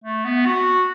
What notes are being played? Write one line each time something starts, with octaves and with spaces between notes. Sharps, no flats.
A3
B3
F#4